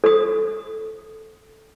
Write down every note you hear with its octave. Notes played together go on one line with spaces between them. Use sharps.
A4 D#6